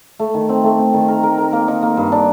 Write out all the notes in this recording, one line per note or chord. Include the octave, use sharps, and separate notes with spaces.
A3
D#3
C4
A3
C4
D#3
A#4
A#4
A#4
A#3
D#4
A#3
G2
D4